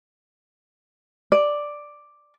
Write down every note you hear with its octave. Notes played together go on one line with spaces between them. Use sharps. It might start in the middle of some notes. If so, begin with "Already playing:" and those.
D5